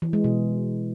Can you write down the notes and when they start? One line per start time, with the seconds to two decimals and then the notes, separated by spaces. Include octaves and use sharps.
0.02 E3
0.13 G#3
0.24 B2